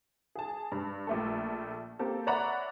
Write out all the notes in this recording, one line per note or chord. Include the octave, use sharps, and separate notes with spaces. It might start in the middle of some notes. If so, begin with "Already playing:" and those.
G#4 A5
G2
A#1 A3 A4
A#3 C4 G4 A4
C#5 D5 E5 F#5 A#5 B5